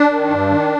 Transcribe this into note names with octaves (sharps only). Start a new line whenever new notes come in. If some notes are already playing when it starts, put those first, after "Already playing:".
Already playing: D4
D#3
G2
D#3